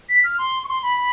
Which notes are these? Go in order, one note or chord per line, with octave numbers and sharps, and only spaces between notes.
B6
F6
C6
C#6
C6
B5
B5